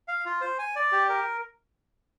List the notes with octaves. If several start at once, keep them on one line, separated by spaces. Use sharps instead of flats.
F5
F4
C5
G#5
D5
G4
A#4